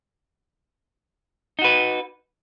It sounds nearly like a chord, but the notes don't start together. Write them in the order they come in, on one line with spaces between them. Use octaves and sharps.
D#4 F#4 B4